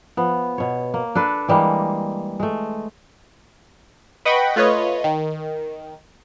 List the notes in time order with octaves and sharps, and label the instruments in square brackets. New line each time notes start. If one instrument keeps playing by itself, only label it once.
[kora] F3 B3
B2 C#5
A#3
D4 A4 B4
E3 G3 G#3 A#3
G#3 A3
[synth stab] B4 D#5 F#5 G5 B5 C#6
A3 F4 B4 C#5 D#5
D#3